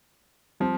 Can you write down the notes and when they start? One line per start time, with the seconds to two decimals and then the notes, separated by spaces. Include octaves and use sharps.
0.60 F3 G3 C4